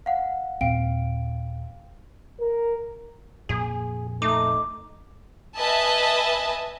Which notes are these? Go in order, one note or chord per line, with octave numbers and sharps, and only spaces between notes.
F5 F#5
D#2 A#2 C4 F5 G5 D7
A#4
F2 A#2 A#3 G#4
A3 D#4 D6
B4 D#5 E5 G#5 A5